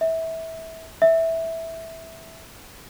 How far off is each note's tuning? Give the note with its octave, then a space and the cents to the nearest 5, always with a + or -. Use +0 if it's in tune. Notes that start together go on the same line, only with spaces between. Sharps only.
E5 -20
E5 -10